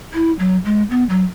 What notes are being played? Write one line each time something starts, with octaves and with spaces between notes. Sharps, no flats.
E4
F#3
G#3
B3
F#3